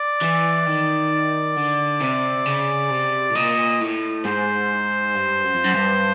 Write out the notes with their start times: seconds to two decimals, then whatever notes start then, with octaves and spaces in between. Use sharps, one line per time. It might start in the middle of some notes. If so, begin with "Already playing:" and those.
Already playing: D5
0.21 E3
0.66 D#3
1.56 D3
2.01 C3
2.45 C#3
2.91 C3
3.30 A2
3.35 A#2 D#5
3.80 A2
4.25 G#2 C5
5.15 G2
5.44 F#2
5.54 F2
5.64 F#2
5.74 G2